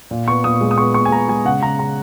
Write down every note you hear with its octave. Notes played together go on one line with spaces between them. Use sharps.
A#2
B3 C#6
A#2 D#6
G#3
D#6
B3 C#6
A#2 C#6
G#5
B3 A#5
G#3 G#5
C#3 F#5
C#3 A#5
C#3 A#5